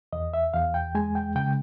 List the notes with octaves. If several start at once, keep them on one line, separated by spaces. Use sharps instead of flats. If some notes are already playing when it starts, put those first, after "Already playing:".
E2 D#5
E5
E2 F5
G5
G#3 G#5
G5
C#3 G5